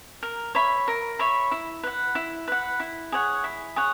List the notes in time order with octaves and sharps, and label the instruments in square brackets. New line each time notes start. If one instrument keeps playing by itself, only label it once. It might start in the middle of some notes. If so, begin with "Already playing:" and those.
[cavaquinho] A#4
C#5 E5 B5
A#4
C#5 E5 B5
E4
B4 F#5
E4
B4 F#5
E4
G#4 C#5 F#5
E4
G#4 C#5 F#5